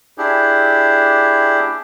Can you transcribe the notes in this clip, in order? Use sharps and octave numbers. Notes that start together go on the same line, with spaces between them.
D4 E4 G4 G#4